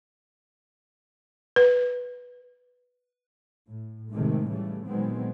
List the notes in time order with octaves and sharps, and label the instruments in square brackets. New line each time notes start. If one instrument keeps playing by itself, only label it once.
[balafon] B4
[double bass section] A2
A2 C3 D#3 G#3 A3
C#3 E3 G3 A3
A#2 D#3 F#3 G#3 B3 C4